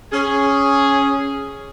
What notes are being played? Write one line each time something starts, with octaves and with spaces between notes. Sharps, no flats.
C#4 G#4